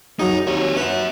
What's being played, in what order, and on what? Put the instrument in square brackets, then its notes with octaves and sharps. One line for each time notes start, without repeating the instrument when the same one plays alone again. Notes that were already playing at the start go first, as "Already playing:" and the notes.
[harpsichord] F#2 F#3 G#4 [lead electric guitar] D#4
[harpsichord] D#2 [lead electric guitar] C4 C#5
[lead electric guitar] C#4 F#4 [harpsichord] B4